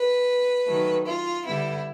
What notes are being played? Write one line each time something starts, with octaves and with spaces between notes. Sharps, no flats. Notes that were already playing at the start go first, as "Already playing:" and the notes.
Already playing: B4
D#3 F#3 A3
F4
D3 G3 B3 E4